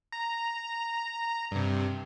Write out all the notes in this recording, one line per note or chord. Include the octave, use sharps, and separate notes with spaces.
A#5
G2 C3